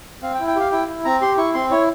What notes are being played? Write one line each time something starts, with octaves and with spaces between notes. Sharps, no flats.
C4 F5
G5
E4
G5
G4 F5
E4 G5
E4
C4 A#5
G4 C6
E4 C#6
C4 C6
E4 C#5